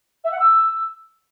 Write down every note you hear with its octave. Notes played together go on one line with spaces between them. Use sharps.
E5
F#5
E6